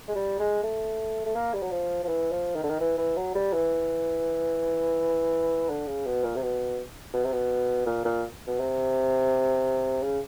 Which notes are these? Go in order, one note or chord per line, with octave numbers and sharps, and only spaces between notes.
G#3
G3
G#3
A3
A3
A#3
G3
F#3
F3
F3
E3
F3
D#3
D3
D#3
E3
E3
F#3
G3
E3
D3
C#3
B2
A#2
C3
B2
B2
C3
B2
A#2
A#2
B2
C3
C#3